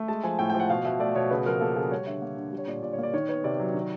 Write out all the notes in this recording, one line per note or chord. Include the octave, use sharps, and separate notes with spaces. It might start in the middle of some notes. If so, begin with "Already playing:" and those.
Already playing: A3
G#3 A5
F3 G#5
A2 G5
F3 G5
F#5
B2 F5
B2 E5
A3 D5
B2 C#5
C#3 B4
F3 A#4
A#3 A4
C#3 G#4
G3 C#5
D3 E5
A#3
D3
G3
C#5
A#2 D5
A#2 D5
C#5
A#3 D5
D#3 C#5
B3 C#5
C3 D5
F#3
D#3